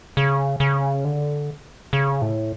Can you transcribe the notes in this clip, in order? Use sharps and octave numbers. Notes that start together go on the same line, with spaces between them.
C#3
C#3
D3
C#3
A2